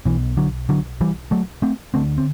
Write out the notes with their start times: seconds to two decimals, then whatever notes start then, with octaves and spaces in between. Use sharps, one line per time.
0.05 B1 B2 E3
0.37 D3 F#3
0.69 D3 F#3
1.01 E3 G3
1.31 F#3 A3
1.62 A3 C4
1.94 D2 D3 A3 C4
2.18 C4